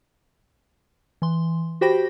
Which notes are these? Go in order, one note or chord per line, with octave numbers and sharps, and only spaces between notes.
E3 C6
F#4 G4 C5 G5 B5 A#6